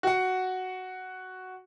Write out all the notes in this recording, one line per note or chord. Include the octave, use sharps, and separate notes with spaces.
F#4 F#5